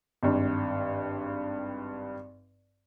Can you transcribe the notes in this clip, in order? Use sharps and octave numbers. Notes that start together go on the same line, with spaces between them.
G#1 G2